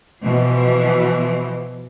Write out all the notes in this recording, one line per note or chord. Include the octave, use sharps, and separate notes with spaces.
B2 E3 F3